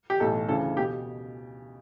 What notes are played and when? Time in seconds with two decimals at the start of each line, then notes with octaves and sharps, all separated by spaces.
0.10 G4
0.20 B1 A2 E3 A4
0.49 D2 C#3 E3 A4
0.77 B2 G4